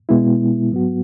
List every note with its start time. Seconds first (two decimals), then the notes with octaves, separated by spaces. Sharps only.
0.09 B2 G#3 B3 E4
0.71 G#2 F#3 B3 F#4